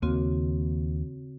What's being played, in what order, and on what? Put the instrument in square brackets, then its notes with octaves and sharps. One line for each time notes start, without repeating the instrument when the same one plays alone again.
[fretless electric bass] D#2 A#3 [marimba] C#3 C4 F#4